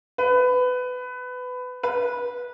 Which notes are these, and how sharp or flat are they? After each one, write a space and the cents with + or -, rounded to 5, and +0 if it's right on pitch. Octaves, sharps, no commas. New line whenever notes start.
B4 +20
B4 -20